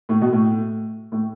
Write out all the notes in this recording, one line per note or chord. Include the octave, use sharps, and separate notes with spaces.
A2
B2
A2
A2